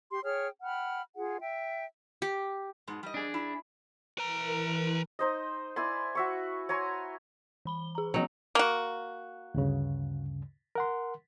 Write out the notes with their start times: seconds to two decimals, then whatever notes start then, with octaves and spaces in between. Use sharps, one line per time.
0.11 G4 C6
0.24 G#4 C#5 G5 F6
0.62 F#5 G5 B5 F6
1.15 F4 G#4 F#5
1.40 E5 G5
2.22 G4
2.87 G#2 B2 G#3
3.03 G3 D#5
3.14 D4 G#4
3.34 E4
4.18 E3 A#4 B4 A#5
5.19 D#4 C5 D#5
5.76 E4 D5 G#5 C6
6.15 F#4 E5 C#6
6.69 C#5 G#5 A#5 C6
7.65 E3 B5 G7
7.95 G#4 A#5
8.14 F3 F#3 B3 C#4 D#4
8.55 A#3 F#4
9.54 D2 G2 C#3
10.75 A#4 F#5 C6